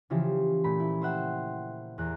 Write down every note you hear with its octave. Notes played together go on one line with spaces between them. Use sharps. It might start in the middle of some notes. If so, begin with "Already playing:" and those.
C#3 E3 F3 G4 C5
A#2 A3 B5
E4
C5 E5 F#5 G5
E2 A#4 F#6